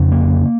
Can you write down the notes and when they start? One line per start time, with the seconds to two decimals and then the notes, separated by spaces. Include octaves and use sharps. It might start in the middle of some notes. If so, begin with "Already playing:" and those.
Already playing: F2 C#3
0.12 A#3